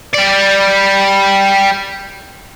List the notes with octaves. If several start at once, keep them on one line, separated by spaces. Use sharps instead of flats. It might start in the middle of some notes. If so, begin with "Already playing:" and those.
G3 D5